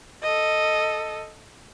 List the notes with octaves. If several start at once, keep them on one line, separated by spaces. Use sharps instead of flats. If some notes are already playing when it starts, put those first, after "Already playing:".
A4 D#5